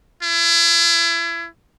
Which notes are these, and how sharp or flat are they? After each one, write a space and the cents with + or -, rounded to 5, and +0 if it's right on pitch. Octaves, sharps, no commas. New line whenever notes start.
E4 +35